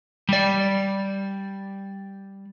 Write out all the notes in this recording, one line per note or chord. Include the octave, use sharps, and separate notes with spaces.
G3 D5